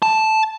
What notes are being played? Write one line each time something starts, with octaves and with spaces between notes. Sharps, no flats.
A5